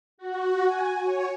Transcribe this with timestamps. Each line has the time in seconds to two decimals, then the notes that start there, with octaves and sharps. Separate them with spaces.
0.18 F#4
0.67 G#5
1.03 C#5